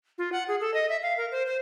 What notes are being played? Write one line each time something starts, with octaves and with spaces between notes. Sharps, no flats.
F4
F#5
G#4
A4
D#5
E5
F5
A#4
C5
C5